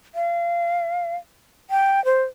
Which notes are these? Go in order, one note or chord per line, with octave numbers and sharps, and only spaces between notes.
F5
G5
C5